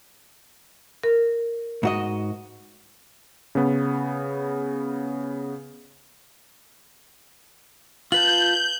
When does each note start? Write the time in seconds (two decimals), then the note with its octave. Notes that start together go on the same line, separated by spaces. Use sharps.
1.03 A#4
1.83 G#2 F#4 D#5
3.55 C#3 B3
8.12 F4 B4 A5 G6 F#7